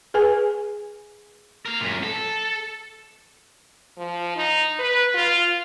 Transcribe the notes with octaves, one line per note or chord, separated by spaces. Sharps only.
G#4 B4 G#5
A#4 F5
F#2 A#2
A4
F3
D#4
B4
F4